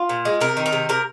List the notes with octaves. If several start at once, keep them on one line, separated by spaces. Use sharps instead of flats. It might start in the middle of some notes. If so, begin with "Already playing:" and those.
Already playing: F4
A#2
G#3
C3 A#4
D#3
A#4
C3
C3 A#4